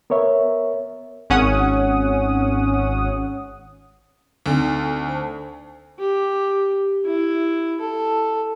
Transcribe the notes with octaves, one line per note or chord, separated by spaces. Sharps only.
B3 A#4 C#5 E5
G#1 C#4 F#5 D#6
D2 C4 D#4 A4
C5 A5
G4
E4
A4